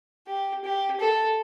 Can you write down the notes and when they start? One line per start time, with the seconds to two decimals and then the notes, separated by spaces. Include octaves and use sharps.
0.27 G4
0.64 G4
1.00 A4